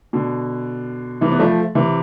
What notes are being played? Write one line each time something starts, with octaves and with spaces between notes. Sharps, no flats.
B2 D3
C3 E3
B3
F3 A3
C3 E3